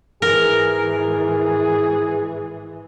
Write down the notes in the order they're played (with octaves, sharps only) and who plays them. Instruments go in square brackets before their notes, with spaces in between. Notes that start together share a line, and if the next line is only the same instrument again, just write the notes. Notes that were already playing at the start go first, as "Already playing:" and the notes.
[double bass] G#2 E3 [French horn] G#4 [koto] A#4